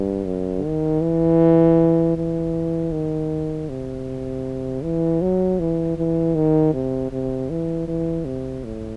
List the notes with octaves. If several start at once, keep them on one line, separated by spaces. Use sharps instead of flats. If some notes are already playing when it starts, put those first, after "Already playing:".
Already playing: G2
F#2
D#3
E3
E3
D#3
C3
E3
F#3
E3
E3
D#3
C3
C3
E3
E3
C3
A2